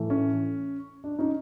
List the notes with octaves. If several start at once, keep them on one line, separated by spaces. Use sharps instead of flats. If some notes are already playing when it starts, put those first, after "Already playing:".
Already playing: A2 E3 A3
C#4
D4
C#4 D#4